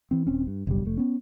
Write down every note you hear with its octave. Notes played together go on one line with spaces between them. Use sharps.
E3 C4
D#1 C4 C#4
G2
F#1 B1 G2 G3
F1 A3
B3 C#4